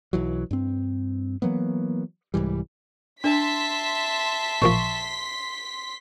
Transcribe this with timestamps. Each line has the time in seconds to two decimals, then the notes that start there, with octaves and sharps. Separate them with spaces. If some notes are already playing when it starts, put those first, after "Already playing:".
0.13 B1 E3 F#3
0.51 G2 C4
1.42 E3 F#3 A#3 B3
2.34 C2 G#2 E3 G3
3.24 D4 E5 A5 C6 B6
4.62 A1 A#2 F3 C#6